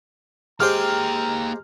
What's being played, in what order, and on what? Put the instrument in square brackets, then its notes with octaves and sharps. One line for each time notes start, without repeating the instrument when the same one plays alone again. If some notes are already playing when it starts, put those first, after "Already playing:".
[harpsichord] G#3 G4 C5 [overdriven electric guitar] A#3 G5 [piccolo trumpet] A#5 [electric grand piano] F6